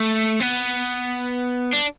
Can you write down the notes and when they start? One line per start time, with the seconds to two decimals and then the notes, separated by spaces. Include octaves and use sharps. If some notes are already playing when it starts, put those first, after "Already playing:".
Already playing: A3
0.40 B3
1.73 D4